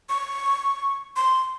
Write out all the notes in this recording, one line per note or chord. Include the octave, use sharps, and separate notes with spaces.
C#6
C6